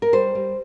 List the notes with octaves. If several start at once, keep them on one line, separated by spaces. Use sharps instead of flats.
A#4
G3 C5
G3